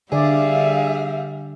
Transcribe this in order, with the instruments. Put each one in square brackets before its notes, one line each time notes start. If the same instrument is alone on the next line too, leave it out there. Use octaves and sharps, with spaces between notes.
[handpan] D3 D5 [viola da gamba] G3 [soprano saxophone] G#4 [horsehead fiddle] E5 F5